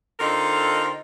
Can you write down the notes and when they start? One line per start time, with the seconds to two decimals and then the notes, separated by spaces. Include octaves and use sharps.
0.20 D3 C4 D#4 F4 A4 A#4